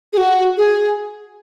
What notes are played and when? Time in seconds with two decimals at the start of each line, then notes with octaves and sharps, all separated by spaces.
0.13 G#4
0.17 F#4
0.58 G#4